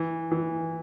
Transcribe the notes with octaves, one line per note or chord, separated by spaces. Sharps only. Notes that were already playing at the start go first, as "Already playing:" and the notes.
Already playing: E3
E3